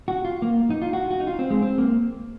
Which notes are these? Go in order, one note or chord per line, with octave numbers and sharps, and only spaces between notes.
F#4
F4
A#3
D#4
F4
F#4
F#4
D#4
F4
C4
G#3
C4
A#3